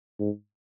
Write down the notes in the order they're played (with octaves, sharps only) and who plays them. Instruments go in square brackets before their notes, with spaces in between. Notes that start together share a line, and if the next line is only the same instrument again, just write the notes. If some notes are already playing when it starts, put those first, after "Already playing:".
[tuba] G#2